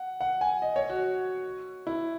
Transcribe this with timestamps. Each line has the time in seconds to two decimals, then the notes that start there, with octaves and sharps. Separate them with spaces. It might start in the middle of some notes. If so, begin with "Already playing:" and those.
Already playing: F#5
0.21 F#5
0.41 G#5
0.62 D#5
0.76 C#5
0.90 F#4
1.87 E4